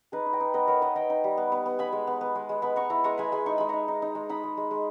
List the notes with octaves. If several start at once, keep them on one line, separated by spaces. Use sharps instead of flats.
D#4 G#4 B4
D#4
D#5 G5
D#4
B3 B4 D#5
B3 A#4 C#5
B3 B4 D#5
D#4 G5 A#5
D#4
G3
B3
B3
B3
B3 G#5 B5
G#3
B3
B3
G#3
G#3
B3 G#5 B5
B3 A#5 C#6
E4 A#5 C#6
G#3 A#5 C#6
G#3 G#5 B5
G#3 G#5 B5
D#4 C#6
G#3 B5
D#4 A#5 C#6
D#4
D#4
G#3
D#4 B5 D#6
G#3
G#3
G#3